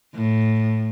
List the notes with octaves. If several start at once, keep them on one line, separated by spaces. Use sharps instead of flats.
A2